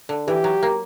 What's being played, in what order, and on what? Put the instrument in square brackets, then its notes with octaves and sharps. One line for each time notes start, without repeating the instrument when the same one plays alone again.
[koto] D3
[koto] E3 [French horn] G4
[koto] F#3
A#3